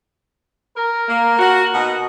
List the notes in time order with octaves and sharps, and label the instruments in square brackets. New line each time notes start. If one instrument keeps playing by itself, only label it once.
[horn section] A#4 A#5
[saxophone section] A#3
F#4
B2 D#4 F#5